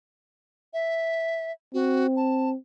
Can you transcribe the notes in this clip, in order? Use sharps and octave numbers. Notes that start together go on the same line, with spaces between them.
E5
C4 F#4
A5